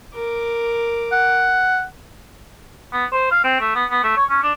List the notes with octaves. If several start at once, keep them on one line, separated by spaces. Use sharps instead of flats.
A#4 D6
F#5
B3
C5
F5
C4
A3
B3
B3
A3
C#5
C#4
D4